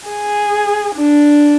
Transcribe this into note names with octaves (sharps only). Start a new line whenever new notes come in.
G#4
D4